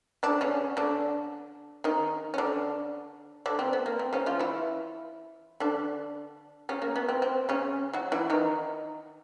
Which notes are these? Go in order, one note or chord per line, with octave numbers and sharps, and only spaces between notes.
D3 D4
C#3 C#4
D3 D4
D#3 D#4
C#4
D3 D4
D3 D4
C4
B3
A#3
C4
C#3 C#4
F3 F4
E3 E4
D3 D4
C#3 C#4
A#3
B3
C4
C4
C#3 C#4
F#3 F#4
E3 E4
D#3 D#4